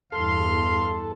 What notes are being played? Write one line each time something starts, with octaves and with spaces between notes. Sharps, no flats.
E2 G2 B2 A4 F5 C6